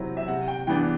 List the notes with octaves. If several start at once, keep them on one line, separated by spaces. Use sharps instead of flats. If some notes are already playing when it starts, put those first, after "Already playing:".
Already playing: C3 F#3 C4 E4
E5
C3 F#5
G5
E3 B3 D4 G5